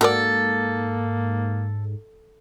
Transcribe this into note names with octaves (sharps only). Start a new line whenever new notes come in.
G#2 A#3 F#4 A4 A#4 D5